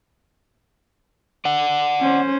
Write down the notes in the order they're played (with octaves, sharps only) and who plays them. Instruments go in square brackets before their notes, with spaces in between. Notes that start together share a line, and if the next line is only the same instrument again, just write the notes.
[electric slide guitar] D5 F#5
[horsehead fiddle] C#4 C5